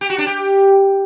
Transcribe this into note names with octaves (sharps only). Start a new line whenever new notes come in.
G4
F#4
D4
G4